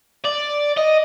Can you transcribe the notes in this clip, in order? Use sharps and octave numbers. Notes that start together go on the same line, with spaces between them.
D5
D#5